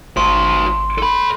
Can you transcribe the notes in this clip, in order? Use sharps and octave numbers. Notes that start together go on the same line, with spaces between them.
G#1 F#4 C5 C6
A4 B5